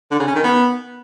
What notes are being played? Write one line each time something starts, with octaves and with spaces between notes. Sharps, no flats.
D3
C#3
C#4
D#3
B3